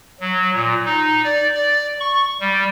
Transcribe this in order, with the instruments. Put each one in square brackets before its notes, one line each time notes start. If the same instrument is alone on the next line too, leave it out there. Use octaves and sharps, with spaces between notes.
[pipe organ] F#3
A#2
D#4
D5
D5
C#6
G3